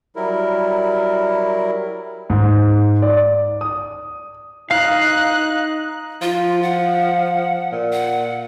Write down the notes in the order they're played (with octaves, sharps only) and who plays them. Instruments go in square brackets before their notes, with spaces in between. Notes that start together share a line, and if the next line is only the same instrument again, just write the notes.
[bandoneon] F#3 G3 E4 A#4
[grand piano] G#2
D5
D#6
[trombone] D#4 [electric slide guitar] F5 [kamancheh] F#6
[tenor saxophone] F3 [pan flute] F4
[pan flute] F#5
[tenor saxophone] A#2
[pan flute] F#5